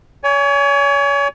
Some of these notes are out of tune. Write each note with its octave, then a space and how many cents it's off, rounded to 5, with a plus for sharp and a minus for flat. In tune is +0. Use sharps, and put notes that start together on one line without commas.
C#5 +35 G#5 -5